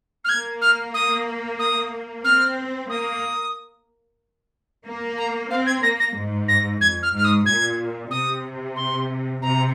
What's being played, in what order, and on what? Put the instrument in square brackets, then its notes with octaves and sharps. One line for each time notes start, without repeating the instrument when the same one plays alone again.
[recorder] F6
[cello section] A#3 [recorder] G#6
[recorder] F6
D#6
D#6
[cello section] C4 [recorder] F6
[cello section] A#3 [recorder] D#6
[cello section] A#3
[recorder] A#5
[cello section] C4 [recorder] F5
[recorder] G#6
[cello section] A#3 [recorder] A#6
[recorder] A#6
[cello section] G#2
[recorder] A#6
[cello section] F2 [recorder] G#6
[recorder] F6
[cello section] G#2 [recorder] F6
[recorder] D#6
[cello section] A#2 [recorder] G#6
[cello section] C3 [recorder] D#6
[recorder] C6
[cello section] C3 [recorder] A#5